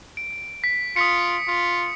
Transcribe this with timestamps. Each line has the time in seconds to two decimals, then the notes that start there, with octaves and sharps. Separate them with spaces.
0.17 D7
0.64 B6
0.96 F4 D#6 B6 C#7
1.47 F4